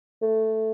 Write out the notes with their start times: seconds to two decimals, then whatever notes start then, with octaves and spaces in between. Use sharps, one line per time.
0.22 A3